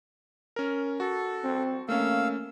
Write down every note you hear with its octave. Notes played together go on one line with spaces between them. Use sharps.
C#4 A#4
F#4 A4
C4
A3 A#3 C#4 F5 E6